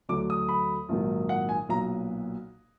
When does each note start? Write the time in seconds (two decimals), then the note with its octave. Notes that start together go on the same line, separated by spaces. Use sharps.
0.09 D2 D3 F#3 D6
0.30 D#6
0.49 B5
0.89 A#1 G#2 D#3 F#3
1.29 F#5
1.49 G#5
1.69 B1 A#2 F#3 A#5